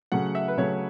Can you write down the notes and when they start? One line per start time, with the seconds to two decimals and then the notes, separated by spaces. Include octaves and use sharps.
0.12 C#3 F#3 A3 F#5
0.35 E5
0.48 B4
0.57 C#3 F#3 A3 C#5